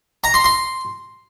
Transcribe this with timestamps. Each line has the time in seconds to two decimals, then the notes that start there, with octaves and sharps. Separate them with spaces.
0.24 A#5
0.34 C6
0.44 C6